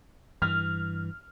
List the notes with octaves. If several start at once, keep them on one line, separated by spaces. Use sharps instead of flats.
G2 E3 F6